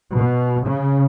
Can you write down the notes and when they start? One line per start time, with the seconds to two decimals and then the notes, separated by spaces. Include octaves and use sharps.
0.15 B2
0.66 C#3